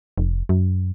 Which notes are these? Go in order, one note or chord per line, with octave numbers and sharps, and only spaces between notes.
F1
F#2